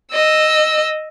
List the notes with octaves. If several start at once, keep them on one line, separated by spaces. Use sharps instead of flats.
D#5 E6